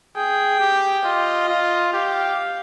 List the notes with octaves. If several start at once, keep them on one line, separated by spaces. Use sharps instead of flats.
G#4 G5
G4
F4 D#5
F4
G4 F5